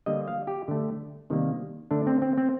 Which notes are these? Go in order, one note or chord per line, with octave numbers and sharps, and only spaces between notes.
D3 G3 A#3 D#5
F5
G4
D3 A3
C3 D#3 G3 A#3
D3 A3 D4
C4
C4
C4